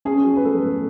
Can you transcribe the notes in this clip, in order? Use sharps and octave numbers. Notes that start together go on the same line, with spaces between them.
C#4 G#4
F#3
B4
A3 A4
A2